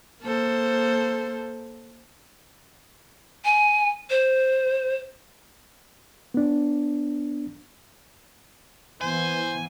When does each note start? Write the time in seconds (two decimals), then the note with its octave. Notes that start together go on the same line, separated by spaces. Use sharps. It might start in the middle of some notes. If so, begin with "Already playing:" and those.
0.22 A#3 A4 C5
3.45 G#5
4.10 C5
6.34 B3 D4
9.01 E3 B3 C5 G#5